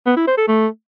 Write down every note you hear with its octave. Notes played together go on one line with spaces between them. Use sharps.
B3
E4
C5
A4
A3